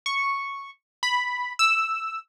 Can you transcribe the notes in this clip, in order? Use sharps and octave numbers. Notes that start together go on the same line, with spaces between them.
C#6
B5
E6